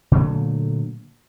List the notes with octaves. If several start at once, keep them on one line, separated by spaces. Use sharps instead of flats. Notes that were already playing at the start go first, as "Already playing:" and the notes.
A#2 D3 F#3 A3